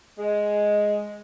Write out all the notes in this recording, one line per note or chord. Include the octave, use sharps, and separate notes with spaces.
G#3